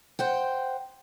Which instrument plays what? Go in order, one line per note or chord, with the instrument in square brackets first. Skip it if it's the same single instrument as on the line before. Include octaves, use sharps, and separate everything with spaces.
[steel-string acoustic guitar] C5 F#5 G5